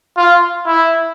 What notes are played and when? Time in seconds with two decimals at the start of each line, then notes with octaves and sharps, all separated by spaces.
0.17 F4
0.66 E4